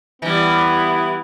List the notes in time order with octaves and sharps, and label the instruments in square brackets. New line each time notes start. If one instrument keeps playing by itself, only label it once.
[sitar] E3 G3 [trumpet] B3 [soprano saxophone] E4